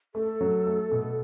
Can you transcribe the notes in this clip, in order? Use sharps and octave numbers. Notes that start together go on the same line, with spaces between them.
A3 A4
F#3
A3
B2